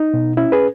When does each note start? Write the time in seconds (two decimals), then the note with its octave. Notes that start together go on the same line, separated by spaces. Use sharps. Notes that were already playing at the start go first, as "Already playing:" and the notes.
Already playing: D#4
0.14 B2
0.37 C#4 E4
0.52 G#4 B4